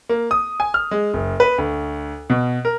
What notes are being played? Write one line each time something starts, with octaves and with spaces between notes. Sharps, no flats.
A#3
D#6
G#5
F6
G#3
F#1
B4
D2
B2
A#4